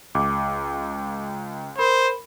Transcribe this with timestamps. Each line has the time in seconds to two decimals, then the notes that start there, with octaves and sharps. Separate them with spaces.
0.15 C#2 D6
1.78 A#4 C5 B5